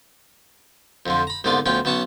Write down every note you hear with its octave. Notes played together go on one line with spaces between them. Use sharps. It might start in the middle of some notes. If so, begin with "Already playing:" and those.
F2 D3 F3
A#5 B5
C2 G#2 D3 B3 F4 D5
D2 F3 B3 C#4 G5
B1 B3 C#4 A5 C#6 D#6